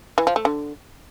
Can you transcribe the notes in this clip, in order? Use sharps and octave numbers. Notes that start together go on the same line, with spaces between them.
E3
F3
A3
D3